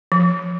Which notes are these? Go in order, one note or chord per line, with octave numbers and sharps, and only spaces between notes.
F3